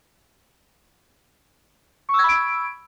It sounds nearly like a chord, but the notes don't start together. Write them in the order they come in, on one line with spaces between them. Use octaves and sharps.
C#6 E6 G#6 B5 D7